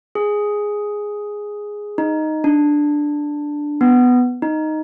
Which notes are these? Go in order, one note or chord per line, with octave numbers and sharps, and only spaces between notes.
G#4
D#4
D4
B3
D#4